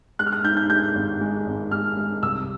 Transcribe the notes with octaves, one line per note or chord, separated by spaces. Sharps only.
G#3 F#6
F6
F#6
G#2 G6
G6
G#3 G6
G#1
G#3
G#1
G#3 F6
G#3
C2 E6